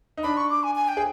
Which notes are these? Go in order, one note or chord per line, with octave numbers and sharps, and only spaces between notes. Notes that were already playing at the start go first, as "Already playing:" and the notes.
D#4
D4 B5
C#6
D6
G#5
G#5
G5
G#4